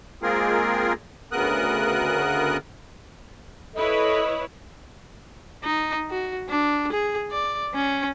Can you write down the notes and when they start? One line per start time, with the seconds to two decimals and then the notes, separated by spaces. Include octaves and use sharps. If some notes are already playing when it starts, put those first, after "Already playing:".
0.23 G#3 A#3 C4 F4 G#4 A#4
1.32 D2 C#3 B3 A#4 D#6 F#6
3.76 E4 A4 B4 C#5 D#5
5.64 D#4
6.10 F#4
6.49 D4
6.93 G#4
7.31 D5
7.74 C#4